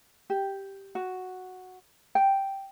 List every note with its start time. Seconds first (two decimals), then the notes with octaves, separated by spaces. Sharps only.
0.30 G4
0.95 F#4
2.15 G5